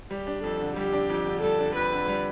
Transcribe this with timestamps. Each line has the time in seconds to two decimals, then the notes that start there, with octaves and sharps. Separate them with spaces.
0.11 G3 G4
0.27 D4
0.44 F2 A4
0.60 D3
0.76 G3 G4
0.93 D4
1.10 F2
1.26 D3
1.42 G3 A4
1.59 D4
1.76 F2 B4
1.92 D3
2.08 G3